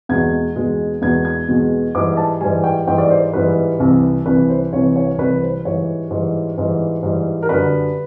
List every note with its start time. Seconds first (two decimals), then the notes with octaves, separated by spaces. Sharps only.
0.09 E2 B2 G#3 G#6
0.56 E2 B2 G#3
1.02 E2 B2 G#3 G#6
1.25 G#6
1.48 E2 B2 G#3
1.95 G#2 E3 G3 D6
2.17 A5
2.41 G#2 E3 G3 G#5
2.64 G5
2.87 G#2 E3 G3 G5
2.98 D5
3.10 C5
3.33 G#2 E3 G3 B4
3.80 C2 C3 E3
4.26 C2 C3 E3 B4
4.49 C5
4.73 C2 C3 E3 C#5
4.96 C#5
5.18 C2 C3 E3 B4
5.42 C5
5.65 G#2 E3 G3 C#5
6.11 G#2 E3 G3
6.58 G#2 E3 G3
7.03 G#2 E3 G3
7.43 A#4
7.49 F#2 D3 G3 B4